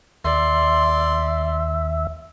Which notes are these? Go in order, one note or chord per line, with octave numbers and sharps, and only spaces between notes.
D#2 D5 E5 C6